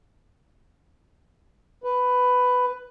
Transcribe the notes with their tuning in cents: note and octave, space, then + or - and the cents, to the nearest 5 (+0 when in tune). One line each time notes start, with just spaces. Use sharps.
B4 +10